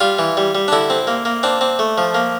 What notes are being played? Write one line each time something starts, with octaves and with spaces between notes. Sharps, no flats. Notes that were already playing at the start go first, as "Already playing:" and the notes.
G3 F4
E3
G3
G3
D4
D3 E4
C4
A#3
A#3
C4 D4
C4
A3
F3
A#3